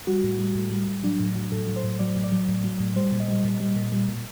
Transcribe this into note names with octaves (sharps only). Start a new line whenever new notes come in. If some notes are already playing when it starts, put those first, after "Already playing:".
G3 F#4
A2
G3
A2
G3
A2
F#3 D4
A2
F#3
A2 A4
F#3
C5
A2
F#3 D5
A2
D5
F#3
A2
F#3
A2
G3 C5
A#2
D#5
G3
A#2
G3
A#2
G3
A#2